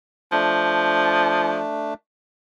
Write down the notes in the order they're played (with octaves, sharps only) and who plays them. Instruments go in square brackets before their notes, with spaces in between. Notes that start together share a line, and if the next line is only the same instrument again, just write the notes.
[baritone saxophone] F3 [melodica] A3 D4